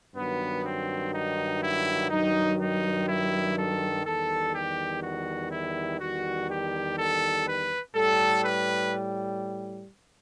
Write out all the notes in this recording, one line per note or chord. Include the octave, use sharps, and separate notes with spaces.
G2 D#3 F#3 B3
C4
D#4
E4
G2 D#3 F#3 D#4
D#4
E4
A4
E2 D#3 G3 A4
G4
F#4
E4
E2 D#3 G3 F#4
G4
A4
B4
A2 G3 A4
B4